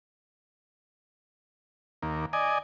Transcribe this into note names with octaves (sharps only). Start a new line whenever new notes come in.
D#2 A#3
D5 D#5 G#5